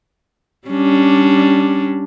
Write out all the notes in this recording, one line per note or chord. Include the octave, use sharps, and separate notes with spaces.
G3 C#4 D4